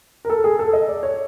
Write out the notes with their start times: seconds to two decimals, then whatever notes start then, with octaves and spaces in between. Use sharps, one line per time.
0.25 A#4
0.30 A4
0.44 G#4
0.59 A4
0.73 D#5
0.89 D5
1.03 C#5